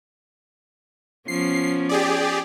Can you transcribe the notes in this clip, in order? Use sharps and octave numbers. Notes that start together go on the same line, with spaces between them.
F3 B3 C#4 C7
G4 G#4 D5